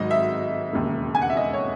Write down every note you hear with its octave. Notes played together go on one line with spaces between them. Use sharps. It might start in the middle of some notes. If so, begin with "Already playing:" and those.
Already playing: G#1 G#2 F#3 D#5
E5
E1 D#2 C#3
G#5
F#5
E5
D#5
C#5